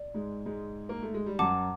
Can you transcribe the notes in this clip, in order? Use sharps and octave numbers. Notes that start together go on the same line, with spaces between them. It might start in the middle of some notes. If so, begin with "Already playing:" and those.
Already playing: D5
G#2 G#3
G#2 G#3
A#3
A3
G#3
G3
F#2 F#3 F#5 A5 D6